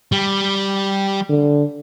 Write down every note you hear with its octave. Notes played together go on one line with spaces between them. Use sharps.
G3
D3